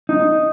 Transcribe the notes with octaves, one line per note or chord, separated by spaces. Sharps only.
D#4